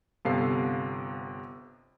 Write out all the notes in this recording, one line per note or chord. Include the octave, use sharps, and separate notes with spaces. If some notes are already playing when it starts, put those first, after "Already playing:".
G1 C3 B3 A4 F5 C7